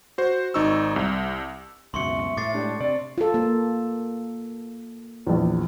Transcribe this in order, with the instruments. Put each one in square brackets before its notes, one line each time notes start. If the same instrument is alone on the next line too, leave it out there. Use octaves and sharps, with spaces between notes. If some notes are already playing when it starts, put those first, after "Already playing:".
[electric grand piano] F#4 C5
G#1 D#4 C#6 E6
C2
[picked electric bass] C#2 F#2 B2 [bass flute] E5 [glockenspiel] C6 C#6 C#7
[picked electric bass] A2 A3 [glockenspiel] D6 A6 C7
[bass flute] G#3 [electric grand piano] D4 G4
[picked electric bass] C3 [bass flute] D4 [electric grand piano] D5
[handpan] F4 A4
A#3
[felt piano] A#1 E2